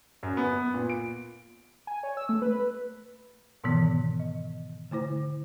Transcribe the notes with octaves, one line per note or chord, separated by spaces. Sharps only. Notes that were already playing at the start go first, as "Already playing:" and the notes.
F#2
B3
A#2
D7
G#5
C#5
E6
A3
B4
G#2 B2 D#3 E3 B3
D#5
D3 A3 E4 C5